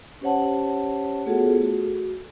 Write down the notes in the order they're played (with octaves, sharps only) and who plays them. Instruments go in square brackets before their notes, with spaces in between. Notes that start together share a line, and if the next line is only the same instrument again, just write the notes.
[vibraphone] C#4 G4 C5 C#5 F#5 A5
A3 B3 F4 F#4 G#4 A4
F#4